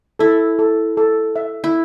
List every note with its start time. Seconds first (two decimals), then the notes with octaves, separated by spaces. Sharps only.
0.19 E4 A4
0.59 A4
0.97 A4
1.36 E5
1.64 E4